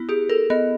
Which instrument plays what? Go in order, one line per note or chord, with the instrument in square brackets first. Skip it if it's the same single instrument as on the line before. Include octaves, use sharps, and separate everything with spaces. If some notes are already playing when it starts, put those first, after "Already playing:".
Already playing: [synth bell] B3 E4
[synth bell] G4 [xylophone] G#4
[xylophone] A4 [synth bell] A#4
[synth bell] B3 [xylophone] D#5